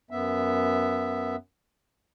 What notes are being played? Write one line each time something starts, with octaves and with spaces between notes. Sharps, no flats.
F#2 B3 E5